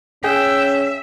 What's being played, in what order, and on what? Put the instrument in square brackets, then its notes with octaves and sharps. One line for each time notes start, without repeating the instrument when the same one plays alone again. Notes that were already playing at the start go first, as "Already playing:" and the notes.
[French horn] C#4 [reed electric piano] G#4 [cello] E5 [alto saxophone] G5